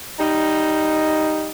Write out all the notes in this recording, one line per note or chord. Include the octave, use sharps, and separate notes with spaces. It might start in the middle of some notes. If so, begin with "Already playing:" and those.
G3 D#4